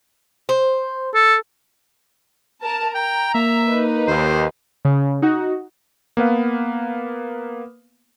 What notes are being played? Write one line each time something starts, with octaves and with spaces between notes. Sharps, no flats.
C5
A4
A#4 A5
G5 A#5
A#3 E5
D#4 B4
D#2 C5
C#3
D#4 F#4
A#3 B3 B4 F5